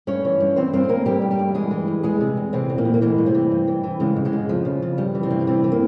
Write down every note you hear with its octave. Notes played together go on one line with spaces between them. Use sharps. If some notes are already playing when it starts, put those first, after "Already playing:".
G2 C#4 C#5
E3
G2
E3 C4 C5
G2 C4 C5
G2 A#3 A#4
G2 G3 G4
G2
G3 G4
G2
E3 G#3 G#4
E3
G2
E2 G#3 G#4
C3
E2
C3 E3 C4
E2
A#2 A#3
E2
A#3
G#2 E3 G#3
G2
C3 C4
E3
G2
E3
E3
G#2 C#3 G#3
F2
G#2 G#3
C#3
F2 F3
C#3
C#3
G2 G3
E3
C3 C4
G2
C3 E3 C4
E3
A#3